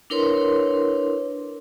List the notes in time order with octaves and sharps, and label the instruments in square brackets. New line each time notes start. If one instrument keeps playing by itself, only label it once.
[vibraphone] D4 E4 A#4 B4 C#5 C6